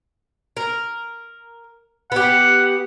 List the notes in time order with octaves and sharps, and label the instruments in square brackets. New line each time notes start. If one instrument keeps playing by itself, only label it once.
[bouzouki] A#4
[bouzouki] B3 G4 [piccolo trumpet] F#5